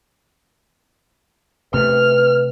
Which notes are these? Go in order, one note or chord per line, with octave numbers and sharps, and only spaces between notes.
C3 A3 B4 F6